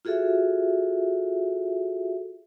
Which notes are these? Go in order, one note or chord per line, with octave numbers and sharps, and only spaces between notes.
F4 F#4 G#4 A4 E5